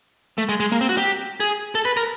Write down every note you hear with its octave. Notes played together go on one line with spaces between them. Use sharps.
A3
G#3
G#3
A#3
C4
F#4
G4
G#4
A4
B4
A#4